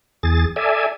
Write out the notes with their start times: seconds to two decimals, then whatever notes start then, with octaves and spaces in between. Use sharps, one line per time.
0.23 E2 G#4 A6
0.56 A4 D5 E5 G#5